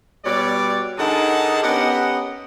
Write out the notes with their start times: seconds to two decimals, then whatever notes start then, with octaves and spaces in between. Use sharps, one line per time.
0.25 B2 G3 C#5 D5
0.97 D3 D#4 G#4 A#4 F#5 A5
1.62 B3 C#4 G4 A#4 D#5 F#5